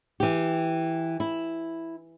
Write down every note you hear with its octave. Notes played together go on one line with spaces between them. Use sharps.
E3 G4
E4